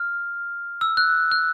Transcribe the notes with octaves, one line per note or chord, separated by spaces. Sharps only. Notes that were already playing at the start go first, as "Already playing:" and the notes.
Already playing: F6
E6
F#6
F#6